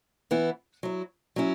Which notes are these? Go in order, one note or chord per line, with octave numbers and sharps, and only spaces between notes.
E3 B3 E4
F#3 E4
F#3 C#4 E4